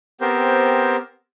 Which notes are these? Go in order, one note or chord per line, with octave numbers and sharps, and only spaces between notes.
B3 C4 G4 A#4 C5